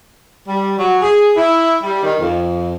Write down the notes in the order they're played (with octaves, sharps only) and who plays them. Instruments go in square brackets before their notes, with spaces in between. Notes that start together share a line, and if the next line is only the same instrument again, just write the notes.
[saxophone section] G3
F#3
G#4
E4
G3
D#3
F2